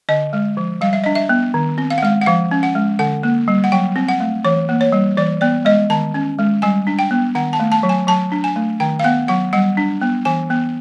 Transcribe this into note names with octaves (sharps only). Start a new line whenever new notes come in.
D3 D#5
G#3
F3
G3 F5
E5
D4 D#5
E5
B3
D#3
C4
F5
F#5
G#3 F5
F#5
F3 F5
C#4
F#5
G#3
D3 F#5
A#3
G3
F#5
F#3 G5
C4
F#5
A3
E3 C#5
A#3
C#5
G3
E3 D5
B3 D5
G#3 D#5
D#3 A5
C#4
G#3
G3 G#5
D4
G5
B3
D#3 F#5
A5
A3
A5
F#3
G#5
F#3 A5
D4
G#5
A3
D#3 G5
F5
B3 F#5
F#3 F#5
G3 F#5
D4
B3
E3 G#5
B3